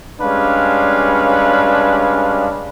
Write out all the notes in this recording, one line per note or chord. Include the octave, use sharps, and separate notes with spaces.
G3 G#3 C#4 D4 B4 F5